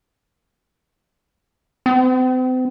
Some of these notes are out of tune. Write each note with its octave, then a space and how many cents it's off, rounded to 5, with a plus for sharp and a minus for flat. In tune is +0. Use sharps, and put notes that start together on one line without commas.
C4 -40